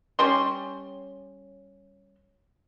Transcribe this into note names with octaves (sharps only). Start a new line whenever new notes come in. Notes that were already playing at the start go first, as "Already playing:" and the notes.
G3 C#4 C6